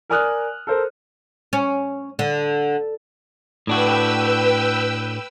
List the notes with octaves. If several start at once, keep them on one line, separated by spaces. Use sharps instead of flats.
A#4 D5 G#5 D#6 F6 F#6
A4 A#4 C5
C#4
D3
A2 D4 F#4 B4 G5 E6